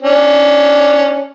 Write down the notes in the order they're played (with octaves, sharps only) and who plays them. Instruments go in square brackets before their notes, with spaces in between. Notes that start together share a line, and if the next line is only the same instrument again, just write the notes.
[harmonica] C#4 D4